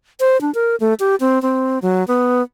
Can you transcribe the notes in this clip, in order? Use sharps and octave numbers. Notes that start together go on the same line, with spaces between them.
C5
D4
A#4
A3
G4
C4
C4
F#3
B3